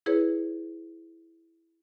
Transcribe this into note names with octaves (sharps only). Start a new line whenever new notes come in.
E4 G#4 B4 C#5